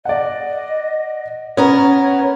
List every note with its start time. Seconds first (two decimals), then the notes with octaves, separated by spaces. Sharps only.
0.05 D5 D#5 F#5
1.57 B3 C#4 A#4 C#5